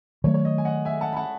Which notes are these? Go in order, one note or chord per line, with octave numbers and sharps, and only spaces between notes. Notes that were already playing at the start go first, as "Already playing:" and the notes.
D#3 F#3 A3 C#5
C#5
D#5
G#5
D#5 F#5
E5 G#5
F#5 A5
B5
F#5 A5